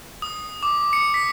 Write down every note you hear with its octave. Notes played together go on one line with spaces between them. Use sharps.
D#6
D6
C#7
B6